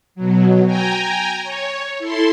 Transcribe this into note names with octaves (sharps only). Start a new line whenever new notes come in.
B2 F#3
G5 G#5 A#5
C#5
E4 A4 C6